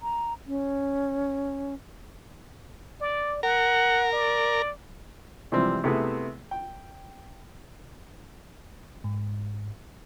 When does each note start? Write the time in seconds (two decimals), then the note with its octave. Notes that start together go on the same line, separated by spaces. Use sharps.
0.02 A#5
0.47 C#4
3.01 D5
3.43 A#4 F#5
4.12 D5
5.52 C3 E3 F3 G3 G#3 C4
5.84 C3 A3 B3 E4 G#4
6.51 G5
9.04 G#2